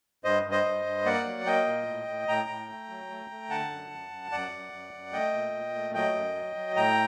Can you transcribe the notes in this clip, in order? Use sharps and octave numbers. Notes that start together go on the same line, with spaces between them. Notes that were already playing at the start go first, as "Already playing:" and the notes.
G2 C5 D#5
G2
C5 D#5
G2
G2
A#3 D5 F#5
F#3
A#3 D#5 G5
A#2
A2
A2
A2 G5 A#5
A2
A3
F#3
A3
A3
D3 F#5 A5
F#2
F#2
F#2
F#2 D5 F#5
F#2
F#2
F#2
A3 D#5 G5
A#2
A#2
A3
F#3 D#5 G5
F#2
F#3
F#3
A2 G5 A#5